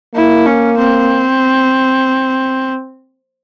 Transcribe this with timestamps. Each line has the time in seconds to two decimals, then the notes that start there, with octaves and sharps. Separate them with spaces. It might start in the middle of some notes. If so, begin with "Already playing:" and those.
0.15 A#3 E4
0.46 C#4
0.77 C4